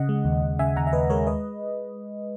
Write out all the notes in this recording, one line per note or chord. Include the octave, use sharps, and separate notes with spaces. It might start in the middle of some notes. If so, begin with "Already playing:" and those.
Already playing: C#3 D#5 F#5
G#3
D#2
D#2
C#3 E5 G#5
D#2 F#5 A#5
E5
D#2 B4 D#5
G#3 A#4 C#5
B4 D#5